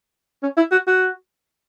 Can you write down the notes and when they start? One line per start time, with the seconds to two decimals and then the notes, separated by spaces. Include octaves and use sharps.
0.43 C#4
0.57 E4
0.72 F#4
0.87 F#4